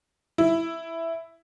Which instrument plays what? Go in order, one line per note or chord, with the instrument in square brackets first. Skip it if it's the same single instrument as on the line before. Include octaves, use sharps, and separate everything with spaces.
[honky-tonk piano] E4